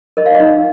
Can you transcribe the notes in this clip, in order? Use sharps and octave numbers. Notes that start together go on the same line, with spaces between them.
A#4 D#5
F5
D#5
D#4